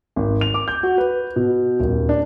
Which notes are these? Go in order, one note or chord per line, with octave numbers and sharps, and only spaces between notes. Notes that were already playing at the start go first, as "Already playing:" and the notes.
G#1
F7
D6
G6
F#4
B4
B2
D#1
D4